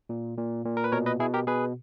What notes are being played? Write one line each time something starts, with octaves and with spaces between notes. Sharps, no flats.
A#2
A#2
A#2
A#4
B4
B2 A#4 C#5
B4 D#5
B2 E4 G#4
G4 A#4
B2 G#4 B4